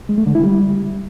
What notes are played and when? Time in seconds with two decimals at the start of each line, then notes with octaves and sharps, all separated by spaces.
0.09 G#3
0.18 A3
0.26 D3
0.35 E4
0.44 G3